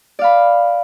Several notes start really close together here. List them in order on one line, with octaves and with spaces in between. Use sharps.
D5 F5 B5